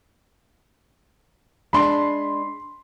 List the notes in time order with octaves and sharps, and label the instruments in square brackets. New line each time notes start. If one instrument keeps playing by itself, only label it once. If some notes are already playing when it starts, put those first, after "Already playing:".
[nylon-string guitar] G#3 D4 [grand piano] B5 C6